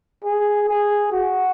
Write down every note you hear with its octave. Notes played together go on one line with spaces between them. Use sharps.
G#4
G#4
F#4